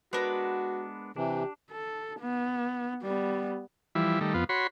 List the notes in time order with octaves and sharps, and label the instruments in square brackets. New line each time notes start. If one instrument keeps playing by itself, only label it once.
[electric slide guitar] G#3 B3 D4 [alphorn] F#4 [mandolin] A#4 B4
[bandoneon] C3 E3 [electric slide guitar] D4 [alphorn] G4
[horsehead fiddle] A4
B3
G3 B3
[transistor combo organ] E3 F3 G3 E4
D#3 G3 A3
F2 B3 F4
F#4 C#5 B5 C6